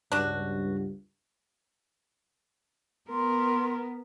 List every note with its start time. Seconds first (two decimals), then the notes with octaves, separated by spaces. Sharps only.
0.12 C#2 G2 D4 F#4
3.10 B3 A#4 C6